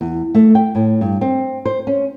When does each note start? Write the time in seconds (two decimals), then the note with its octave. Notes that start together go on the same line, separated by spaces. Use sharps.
0.01 E2
0.35 A3
0.55 G5
0.75 A2
1.01 G2
1.21 C4
1.65 C5
1.87 C#4